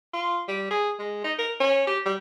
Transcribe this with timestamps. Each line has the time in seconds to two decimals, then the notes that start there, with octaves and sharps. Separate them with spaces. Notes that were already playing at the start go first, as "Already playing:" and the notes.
0.13 F4
0.48 G3
0.71 G#4
0.99 G#3
1.24 D#4
1.38 A#4
1.60 C#4
1.87 G4
2.05 G3